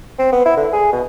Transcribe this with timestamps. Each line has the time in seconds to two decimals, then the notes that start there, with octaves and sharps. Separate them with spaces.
0.19 C4
0.32 B3
0.46 E4
0.57 D3
0.73 G#4
0.92 B2